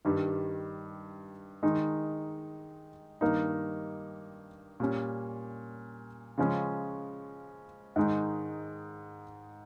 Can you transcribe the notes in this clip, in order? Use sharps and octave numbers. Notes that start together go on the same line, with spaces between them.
G2 D#3 G3
D#3 G#3 D#4
G2 D#3 A#3 D#4
A#2 G3 C#4
C#3 F3 G#3 C#4
G#2 D#3 G#3 D#4